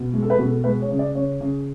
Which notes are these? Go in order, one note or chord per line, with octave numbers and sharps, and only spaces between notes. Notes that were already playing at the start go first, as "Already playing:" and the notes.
Already playing: B2
G#3
A4
B4
B2
A4
G#3 B4
C#5
C#3
D5
C#3 C#5
C#3